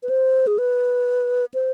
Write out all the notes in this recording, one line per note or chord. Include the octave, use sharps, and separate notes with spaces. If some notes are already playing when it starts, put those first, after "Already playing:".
B4
C5
G#4
B4
C5